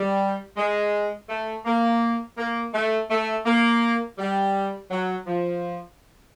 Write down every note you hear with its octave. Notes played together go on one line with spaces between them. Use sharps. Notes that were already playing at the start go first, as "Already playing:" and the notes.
Already playing: G3
G#3
A3
A#3
A#3
A3
A3
A#3
G3
F#3
F3